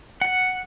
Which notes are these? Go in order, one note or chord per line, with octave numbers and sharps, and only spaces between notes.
F#5